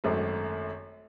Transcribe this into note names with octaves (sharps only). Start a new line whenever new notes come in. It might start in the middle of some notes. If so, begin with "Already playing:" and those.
G#1 F#2 A3